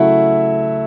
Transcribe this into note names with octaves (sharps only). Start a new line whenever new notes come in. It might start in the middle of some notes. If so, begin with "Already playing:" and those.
Already playing: C#3 F#3 A3 E4 E5 F#5